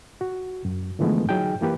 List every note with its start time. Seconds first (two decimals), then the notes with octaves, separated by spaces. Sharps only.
0.21 F#4
0.65 F#2
0.99 D3 E3 F3 G#3 A3 B3
1.29 F#3 D#4 G#4 G5
1.61 E3 A#3 G4 B4